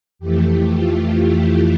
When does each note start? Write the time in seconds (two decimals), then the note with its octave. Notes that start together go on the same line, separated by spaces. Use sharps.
0.19 F2 E3 A3 G4
0.70 F4
1.20 E4